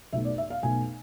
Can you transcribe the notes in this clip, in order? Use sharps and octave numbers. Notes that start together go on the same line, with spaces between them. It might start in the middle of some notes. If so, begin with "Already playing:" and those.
B1 B2 A3 E5
D5
E5
F5
B1 B2 A3 G#5